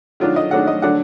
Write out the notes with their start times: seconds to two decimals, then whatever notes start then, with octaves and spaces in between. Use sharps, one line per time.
0.20 D#3 F#3 D4 F4
0.36 D#5
0.51 D#3 F#3 D4 F#5
0.67 D#5
0.82 D3 F#3 D4 F#5